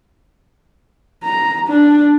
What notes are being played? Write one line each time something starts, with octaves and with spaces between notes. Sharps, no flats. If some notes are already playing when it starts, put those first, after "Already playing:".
A#5
D4